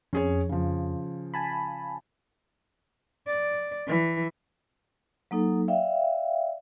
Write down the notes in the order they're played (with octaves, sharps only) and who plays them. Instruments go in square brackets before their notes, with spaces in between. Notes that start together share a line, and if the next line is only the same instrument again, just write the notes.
[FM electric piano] F2 [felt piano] C#4 G#4 C#5
[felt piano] C#3 F3
[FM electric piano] G#5 A5 B5
[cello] D5
E3
[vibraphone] F#3 A#3 D#4 A4
D5 E5 F5 G5